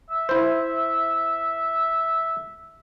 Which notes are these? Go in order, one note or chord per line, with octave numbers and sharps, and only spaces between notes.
E5
E4 C5